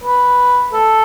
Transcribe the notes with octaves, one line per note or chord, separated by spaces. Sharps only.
B4
A4